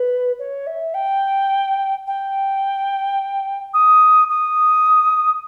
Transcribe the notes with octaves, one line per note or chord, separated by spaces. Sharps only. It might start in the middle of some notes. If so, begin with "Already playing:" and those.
Already playing: B4
C#5
E5
G5
G5
D#6
D#6